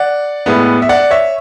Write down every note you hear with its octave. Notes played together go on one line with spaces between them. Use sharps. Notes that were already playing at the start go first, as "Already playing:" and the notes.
Already playing: D5 F#5
A2 G#3 B3
E5
D5 F#5
C#5 E5